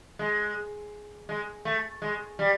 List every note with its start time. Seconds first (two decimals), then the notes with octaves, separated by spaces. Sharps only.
0.19 G#3
1.29 G#3
1.65 A3
2.02 G#3
2.39 G3